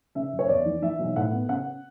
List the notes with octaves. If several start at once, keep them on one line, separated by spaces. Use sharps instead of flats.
C#3 E5
F#1
C#5
E2 D5
E3
E3 E5
B1
A2 F#5
B3
C#3 F#5